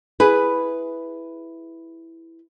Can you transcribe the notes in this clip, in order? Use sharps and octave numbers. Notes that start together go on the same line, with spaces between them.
E4 G#4 B4